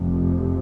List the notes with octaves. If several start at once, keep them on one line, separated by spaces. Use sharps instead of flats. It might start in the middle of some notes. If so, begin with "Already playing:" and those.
Already playing: F1 F2 C3